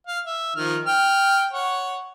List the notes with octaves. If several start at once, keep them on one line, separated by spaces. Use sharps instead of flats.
F5
E5
D#3 F3 F6
G5 F6
C#5 F#5